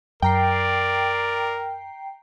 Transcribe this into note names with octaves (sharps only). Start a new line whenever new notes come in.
F#2 A#4 D5 G5 A#5 C7